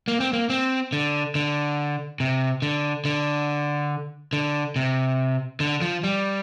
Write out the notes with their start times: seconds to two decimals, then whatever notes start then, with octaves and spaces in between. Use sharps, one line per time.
0.08 A#3
0.20 C4
0.33 A#3
0.50 C4
0.93 D3
1.35 D3
2.20 C3
2.62 D3
3.05 D3
4.33 D3
4.76 C3
5.60 D3
5.82 F3
6.03 G3